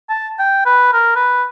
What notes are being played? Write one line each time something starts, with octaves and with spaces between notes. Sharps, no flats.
A5
G5
B4
A#4
B4